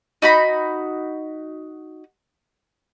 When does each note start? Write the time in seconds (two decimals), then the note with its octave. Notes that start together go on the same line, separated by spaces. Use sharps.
0.22 D#4 F#4 A#5 B5